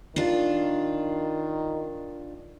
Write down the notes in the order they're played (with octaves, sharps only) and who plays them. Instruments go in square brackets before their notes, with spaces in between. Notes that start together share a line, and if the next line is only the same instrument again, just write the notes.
[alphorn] D#3 [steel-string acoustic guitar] D4 F4